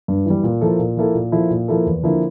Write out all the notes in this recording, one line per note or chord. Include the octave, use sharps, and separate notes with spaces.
G2
E3 G3
A#2
F3 A#3 E4 A4
A#2
F3 A#3 E4 A4
A#2
F3 A#3 E4 A4
A#2
F3 A#3 E4 A4
E2
D3 F3 A#3 E4